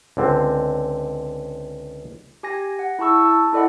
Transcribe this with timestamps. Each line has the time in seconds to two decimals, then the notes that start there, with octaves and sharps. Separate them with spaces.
0.17 C#2 D3 C4
2.43 G4 G#5 A#6
2.79 F#5
2.99 E4 G#4 A5 C#6 E6
3.25 A5
3.53 E4 A4 D5 D#5 F#5